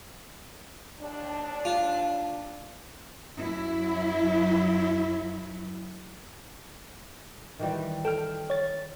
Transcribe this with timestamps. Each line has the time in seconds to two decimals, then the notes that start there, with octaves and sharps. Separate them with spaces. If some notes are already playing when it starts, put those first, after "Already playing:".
1.00 D#2 D4
1.65 F4
3.38 F#2 F#3 E4
7.59 D#3 E3 G3
8.05 A4 G5 F6
8.50 C#5 A6